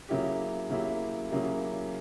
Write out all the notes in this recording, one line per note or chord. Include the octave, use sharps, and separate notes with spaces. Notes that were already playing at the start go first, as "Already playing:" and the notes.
C#3 F#3 A#3 E4 G4
C#3 F#3 A#3 E4 G4
C#3 F#3 A#3 E4 G4